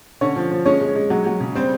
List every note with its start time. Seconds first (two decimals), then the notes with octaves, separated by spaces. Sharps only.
0.21 D3 C#4 C#5
0.36 F3
0.51 F3
0.66 G#3 C#4 C#5
0.80 G#3
0.95 G#3
1.10 F#3
1.26 F#3
1.40 C#3
1.55 G3 C4 C5